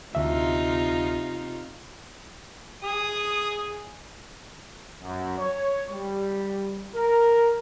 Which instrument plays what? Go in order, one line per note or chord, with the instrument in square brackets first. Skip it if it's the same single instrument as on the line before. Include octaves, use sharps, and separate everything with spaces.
[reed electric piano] D2 E5 [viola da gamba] C3 D#4 F4
[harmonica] G#4 G#5 [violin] D#6
[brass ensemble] F#2
C#5
G3
A#4